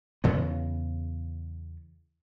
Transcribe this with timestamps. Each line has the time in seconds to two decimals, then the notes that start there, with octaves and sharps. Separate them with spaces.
0.24 E2 C#3 B3